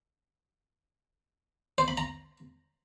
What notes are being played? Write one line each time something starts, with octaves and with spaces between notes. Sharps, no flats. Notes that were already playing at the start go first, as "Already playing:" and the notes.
C5
B5
A#5